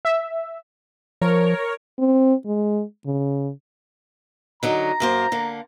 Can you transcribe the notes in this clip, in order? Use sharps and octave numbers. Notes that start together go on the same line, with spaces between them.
E5
F3 A#4 C#5
C4
G#3
C#3
D3 F#3 D#4 A#5
F#2 A#3 C5
D3 A#3